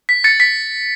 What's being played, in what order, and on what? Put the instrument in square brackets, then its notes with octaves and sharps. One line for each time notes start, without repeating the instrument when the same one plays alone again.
[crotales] B6
A6 C#7
B6